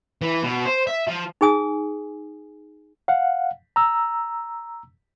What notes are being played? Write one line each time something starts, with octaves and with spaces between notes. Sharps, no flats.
E3
B2
C5
E5
F3
D#4 G#4 G#5 D#6
F5 F#5
A#5 E6